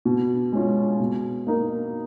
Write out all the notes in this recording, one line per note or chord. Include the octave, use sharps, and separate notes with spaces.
B2
G#3 C#4 F4
B2
A#3 D#4 A#4